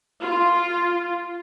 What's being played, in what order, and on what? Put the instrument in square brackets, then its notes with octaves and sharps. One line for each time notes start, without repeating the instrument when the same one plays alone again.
[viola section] F4